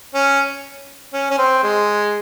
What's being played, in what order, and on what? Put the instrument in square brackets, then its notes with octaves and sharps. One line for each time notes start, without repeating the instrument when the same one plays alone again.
[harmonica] C#4
C#4
C#4
C4
G#3